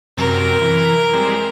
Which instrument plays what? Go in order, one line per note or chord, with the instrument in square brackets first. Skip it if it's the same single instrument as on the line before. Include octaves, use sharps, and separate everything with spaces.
[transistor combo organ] F#2 C3 [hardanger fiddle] A#4
[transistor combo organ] E3
G3 G#3 C4